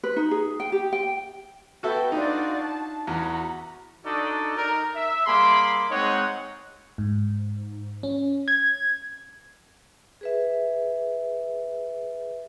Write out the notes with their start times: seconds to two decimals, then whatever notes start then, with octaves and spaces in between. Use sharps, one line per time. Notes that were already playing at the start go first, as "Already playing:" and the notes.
0.03 B4
0.16 D#4
0.31 G#4
0.60 G5
0.72 G4
0.93 G5
1.83 B3 F#4 A4 E5 G5
2.12 D4 D#4 F4 F#4 D5
2.60 A5
3.07 E2 F#4 A#5 B5
4.05 D4 D#4 F#4 A4 D5 D#5
4.56 D#4 A#4
4.95 E5
5.26 G3 A#3 G#4 B5 C6 D6
5.90 G#3 C4 D#4 C#5 D#5 F#5
6.98 G#2
8.03 C#4
8.48 G#6
10.21 G#4 B4 E5